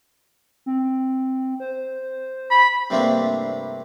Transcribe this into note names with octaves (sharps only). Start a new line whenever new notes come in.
C4
C5
B5
G2 C3 A3 A#3 C4 D4